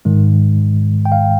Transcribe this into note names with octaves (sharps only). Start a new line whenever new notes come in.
G#2 D#3 G#3
G5
F5